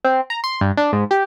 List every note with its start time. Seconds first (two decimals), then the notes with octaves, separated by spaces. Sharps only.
0.05 C4
0.30 A#5
0.44 C6
0.61 G2
0.77 D4
0.93 G#2
1.11 G4